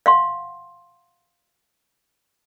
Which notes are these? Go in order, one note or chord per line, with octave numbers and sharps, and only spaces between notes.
F5 F#5 C6